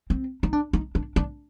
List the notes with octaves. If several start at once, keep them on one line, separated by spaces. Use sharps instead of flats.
C4
D#4
D4
D#4
D4
D4